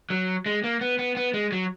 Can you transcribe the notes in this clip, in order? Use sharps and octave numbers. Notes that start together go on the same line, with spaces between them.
F#3
G#3
A#3
B3
B3
B3
G#3
F#3